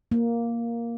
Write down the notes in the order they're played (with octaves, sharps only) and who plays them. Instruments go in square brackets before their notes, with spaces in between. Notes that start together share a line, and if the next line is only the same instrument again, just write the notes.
[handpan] A#3